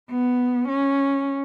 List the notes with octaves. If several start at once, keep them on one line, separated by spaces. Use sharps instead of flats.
B3
C#4